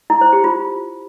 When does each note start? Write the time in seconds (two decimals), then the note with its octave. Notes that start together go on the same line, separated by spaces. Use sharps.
0.10 E4
0.21 C5
0.33 G4
0.44 F4